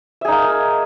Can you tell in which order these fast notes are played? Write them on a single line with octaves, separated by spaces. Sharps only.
E5 G#4 D#4 A#3